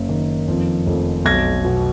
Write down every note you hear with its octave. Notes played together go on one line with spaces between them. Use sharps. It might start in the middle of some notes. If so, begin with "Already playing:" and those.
Already playing: F#1
D#3
F2
F1
B1 G#6 A#6
B2